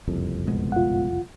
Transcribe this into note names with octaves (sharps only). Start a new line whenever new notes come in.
F#1 C2 F2
B2 G#3 B3
F4 F#5